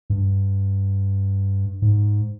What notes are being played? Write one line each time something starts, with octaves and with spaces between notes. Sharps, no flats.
G2
G#2